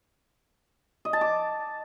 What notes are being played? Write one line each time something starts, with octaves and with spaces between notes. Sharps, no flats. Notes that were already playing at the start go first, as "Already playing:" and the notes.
D#5
A5
D6